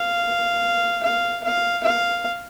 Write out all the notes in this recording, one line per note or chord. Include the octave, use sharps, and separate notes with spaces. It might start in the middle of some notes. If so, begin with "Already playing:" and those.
Already playing: F5
F5
F5
F5